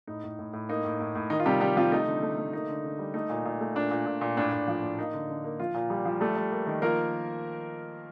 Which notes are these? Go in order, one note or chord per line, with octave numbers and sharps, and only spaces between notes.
A2 D#4
A2
A2
A2
A#3 D#4
A2
A2
A2
D#3 D#4
F4
C3 G3 G4
C3 G3 G4
C3 F3 F4
A3 D#4
D3
A3
A3
A#3 D#4
D3
D3
G3
A3 D#4
A#2
A#2
A3
A#2 D4
A#2
A#2
A#2
A2 D4
A2
F3
A2
A#3 D#4
D3
D3
A#3
F3 F4
A#2
F3 G3 G4
F3
G3 A3 A4
G3
A#3
D#3
F3 A#3 A#4